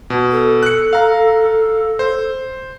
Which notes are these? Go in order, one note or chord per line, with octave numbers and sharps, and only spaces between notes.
B2
A4
F#6 C#7
F5 A#5
C5